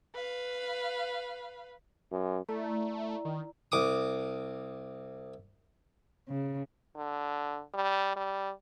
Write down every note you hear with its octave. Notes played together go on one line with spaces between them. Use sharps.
B4 F5
F#2
A3 E4 D5 A#5
D#3
C2 D6 D#6
C#3
D3
G3
G3